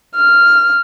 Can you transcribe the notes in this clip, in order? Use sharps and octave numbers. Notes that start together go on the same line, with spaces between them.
F6